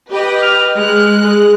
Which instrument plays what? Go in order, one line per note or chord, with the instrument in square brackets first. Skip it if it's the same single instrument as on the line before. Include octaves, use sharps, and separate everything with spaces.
[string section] G4 B4 D#5
[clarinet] F6
[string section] G#3 F#6
[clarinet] G#4